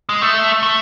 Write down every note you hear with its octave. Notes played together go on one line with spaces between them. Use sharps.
G#3
A3
A3